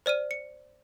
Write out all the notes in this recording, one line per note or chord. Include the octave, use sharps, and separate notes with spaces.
C5 D5 F6 D#7
C#7